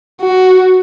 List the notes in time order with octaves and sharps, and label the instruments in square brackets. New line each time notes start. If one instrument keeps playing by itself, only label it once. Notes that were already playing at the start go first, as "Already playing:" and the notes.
[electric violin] F#4